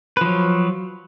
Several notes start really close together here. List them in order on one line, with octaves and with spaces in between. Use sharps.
B4 F3 F#3